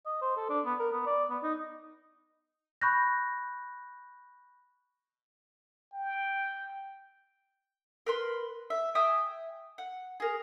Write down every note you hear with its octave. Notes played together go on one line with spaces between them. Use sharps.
D#5
C5
A4
D4
B3
A#4
B3
D5
B3
D#4
B5 C#6 F#6 G6 A#6
G5
A#4 B4 C6
E5
E5 G5 G#5 D#6
F#5
G#4 A#4